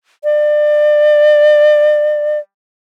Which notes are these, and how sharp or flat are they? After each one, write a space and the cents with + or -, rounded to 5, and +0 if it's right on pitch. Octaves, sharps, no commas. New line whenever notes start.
D5 +30